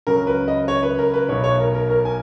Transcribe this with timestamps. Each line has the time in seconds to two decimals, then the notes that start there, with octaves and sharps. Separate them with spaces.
0.07 C#2 C#3 F#3 A#4
0.27 B4
0.48 D#5
0.68 C#5
0.83 B4
0.99 A#4
1.14 B4
1.29 B1 B2 F#3 C#5
1.44 C#5
1.60 A#4
1.74 A#4
1.90 A#4
2.05 G#5